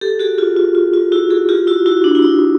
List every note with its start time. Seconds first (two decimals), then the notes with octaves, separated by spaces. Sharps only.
0.01 G4 A4
0.19 F#4 G#4
0.38 F4 G4
0.57 F4
0.75 F4
0.93 F4
1.12 E4 F#4
1.30 F#4 G#4
1.49 F4 G4
1.67 E4 F#4
1.86 E4 F#4
2.04 D4
2.15 E4
2.22 D#4